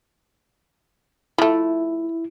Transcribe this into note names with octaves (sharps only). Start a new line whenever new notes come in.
F3 A3 E4